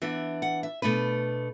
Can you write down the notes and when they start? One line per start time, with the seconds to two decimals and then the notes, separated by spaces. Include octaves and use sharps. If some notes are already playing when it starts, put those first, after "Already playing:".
0.02 E3 B3 D4 E5
0.42 F#5
0.63 E5
0.82 B2 A3 D4 B4